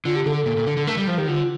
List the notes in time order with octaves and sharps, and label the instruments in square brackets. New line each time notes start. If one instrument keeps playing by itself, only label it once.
[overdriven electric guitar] D3 [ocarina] F4
[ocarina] G4
[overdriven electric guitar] D3 [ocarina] A4
[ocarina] A4
[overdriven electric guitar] A#2
A#2
D3
D3
[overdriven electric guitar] A3 [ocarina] A#4
[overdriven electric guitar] G3
[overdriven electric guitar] F3 [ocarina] C5
[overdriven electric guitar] D#3 [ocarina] G4
[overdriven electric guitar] D3 [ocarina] F4